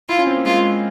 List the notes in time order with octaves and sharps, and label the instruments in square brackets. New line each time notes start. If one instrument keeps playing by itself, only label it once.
[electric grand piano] E4 [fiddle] F4
[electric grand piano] C#4
C4
A#3
[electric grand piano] G#3 [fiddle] F4